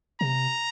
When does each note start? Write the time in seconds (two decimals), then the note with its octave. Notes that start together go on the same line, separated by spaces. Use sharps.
0.20 C3 A#5